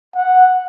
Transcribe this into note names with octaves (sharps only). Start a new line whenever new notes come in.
F#5